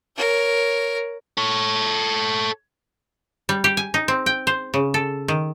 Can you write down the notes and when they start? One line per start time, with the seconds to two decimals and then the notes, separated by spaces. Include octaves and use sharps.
0.16 A#4 C#5
1.38 A4 C#5
3.49 G3
3.64 G4
3.77 G#5
3.94 D#4
4.08 C4
4.26 G5
4.47 C5
4.74 C#3
4.94 A4
5.28 D#3